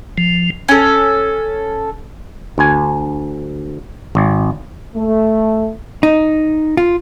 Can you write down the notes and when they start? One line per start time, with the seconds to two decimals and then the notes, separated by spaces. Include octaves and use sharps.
0.18 F3
0.68 C#4 A4
2.58 D2 G#5
4.15 G#1
4.96 A3
6.03 D#4
6.77 F4